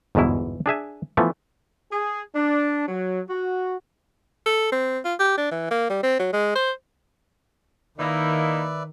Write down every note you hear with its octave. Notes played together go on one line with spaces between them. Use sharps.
G1 E2 G#2 B2 E4
D4 G#4 E5 G#5
E3 F3 A3 B3
G#4
D4
F#3
F#4
A4
C4
F4
G4
D4
E3
A#3
G3
C4
F#3
G#3
C5
D#3 A#3 D#4 E4 B4 D5 E5